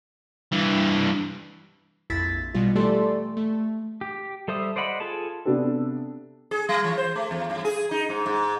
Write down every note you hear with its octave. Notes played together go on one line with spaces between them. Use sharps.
G2 E3
A#1 F2 E4 A6 B6
B2 G3 F4
E3 A3 G4 A4 D5 C6
A3
G4
G3 A4 C5 E5 D#6
C5 D5 D#5 F#5 B5
F4 G#4 A4 A5
C3 B3 D4 G4 A4
G#4
G3
E3
C5
A3
E2
G2
G#4
D#4
G#2
G#2